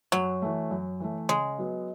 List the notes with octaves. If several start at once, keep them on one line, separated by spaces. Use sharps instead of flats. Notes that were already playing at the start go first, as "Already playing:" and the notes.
F#2 F#3
E3 A3
F#2
E3 A3
C#3 G#3
F#3 B3